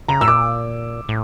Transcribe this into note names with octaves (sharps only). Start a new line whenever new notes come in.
C#3 A#5
A2 E6
A#2 D6
A2